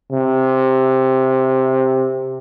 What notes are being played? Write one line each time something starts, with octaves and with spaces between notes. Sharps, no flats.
C3